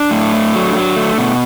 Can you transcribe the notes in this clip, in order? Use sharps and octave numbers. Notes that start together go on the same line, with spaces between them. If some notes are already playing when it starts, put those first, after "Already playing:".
Already playing: D4
A2
A3
F#3
F#3
A3
B2